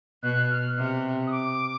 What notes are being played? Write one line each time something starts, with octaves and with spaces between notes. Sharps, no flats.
B2 F#6
F6
C3
D#6
D6